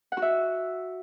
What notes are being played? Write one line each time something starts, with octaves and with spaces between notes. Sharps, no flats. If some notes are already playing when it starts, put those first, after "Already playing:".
F#5
F#4
E5